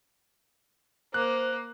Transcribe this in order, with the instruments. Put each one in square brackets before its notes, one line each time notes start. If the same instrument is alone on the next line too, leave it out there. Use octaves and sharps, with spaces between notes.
[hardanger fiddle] A#3 [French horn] C5 [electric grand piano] F#6